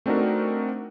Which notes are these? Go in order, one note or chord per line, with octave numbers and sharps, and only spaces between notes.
A3 C4 D4 D#4 F#4 A#4